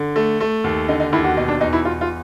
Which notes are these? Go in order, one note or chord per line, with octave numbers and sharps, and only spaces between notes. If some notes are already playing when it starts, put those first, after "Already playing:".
Already playing: D3
A3
A3
D#2
D3 D#4
D#4
D#2 E4
F#4
B2 D#4
D4
E2 D#4
E4
E2 F4
F4